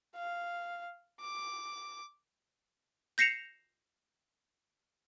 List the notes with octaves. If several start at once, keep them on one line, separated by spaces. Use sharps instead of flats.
F5
D6
G6 A#6 C7 C#7 E7 F7